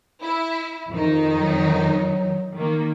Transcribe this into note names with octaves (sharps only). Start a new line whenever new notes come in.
E4
F2 D#3 D#4
F#3
D#3 A#3